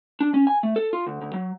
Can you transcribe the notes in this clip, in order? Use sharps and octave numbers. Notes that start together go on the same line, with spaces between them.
D4
C#4
G#5
A3
A4
F4
D2
D2
F#3